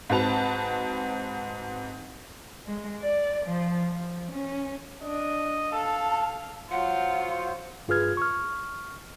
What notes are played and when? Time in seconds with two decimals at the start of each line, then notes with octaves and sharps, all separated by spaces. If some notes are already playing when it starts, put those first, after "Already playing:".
0.10 G#2 C4 F#4 B4 A5 F7
2.67 G#3
3.00 D5
3.46 F3
3.92 F3
4.32 C#4
5.02 D4 D#5
5.72 A4 F5 A5
6.71 F#3 F4 C5 F#5
7.88 G2 F4 G#4 B4 F6 G#6
8.17 C#6 F6